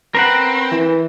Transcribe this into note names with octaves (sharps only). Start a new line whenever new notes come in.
C4 A#4 B4 F#5
E3